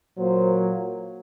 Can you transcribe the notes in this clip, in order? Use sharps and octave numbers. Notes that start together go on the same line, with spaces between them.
A#2 F#3 A#3 C5